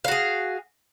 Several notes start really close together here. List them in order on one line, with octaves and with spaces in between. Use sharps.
F5 F#4 G#4